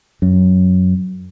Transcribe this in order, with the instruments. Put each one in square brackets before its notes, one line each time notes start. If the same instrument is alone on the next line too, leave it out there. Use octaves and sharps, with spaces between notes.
[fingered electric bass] F#2